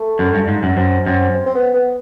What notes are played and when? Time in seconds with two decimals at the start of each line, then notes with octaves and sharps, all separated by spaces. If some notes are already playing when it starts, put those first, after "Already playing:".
Already playing: A3
0.19 F#2
0.34 G2
0.48 G#2
0.63 F#2
0.77 F#2 C4
1.06 F#2 C4
1.35 C4
1.46 C4
1.55 B3
1.74 B3